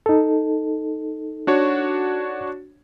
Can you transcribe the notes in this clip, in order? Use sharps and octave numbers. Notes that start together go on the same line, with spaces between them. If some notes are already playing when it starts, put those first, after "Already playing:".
D#4 A4
D4 F#4 C#5